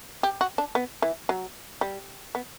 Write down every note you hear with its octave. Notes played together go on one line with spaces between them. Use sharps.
G4
F#4
D4
B3
E3
F#3
G3
B3